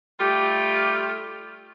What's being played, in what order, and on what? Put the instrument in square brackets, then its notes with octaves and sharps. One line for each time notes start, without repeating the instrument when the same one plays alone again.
[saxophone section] G3 A3 F4 G4